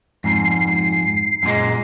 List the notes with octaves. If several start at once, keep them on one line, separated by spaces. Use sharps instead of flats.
F2 G#2 C7
F#2 A#2 G#3